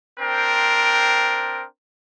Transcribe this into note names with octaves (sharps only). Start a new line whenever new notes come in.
C4 D4 A#4 C5 G5